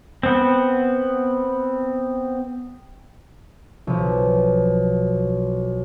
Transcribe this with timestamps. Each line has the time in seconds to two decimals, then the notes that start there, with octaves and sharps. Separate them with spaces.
0.23 B3 C4
3.87 B1 F3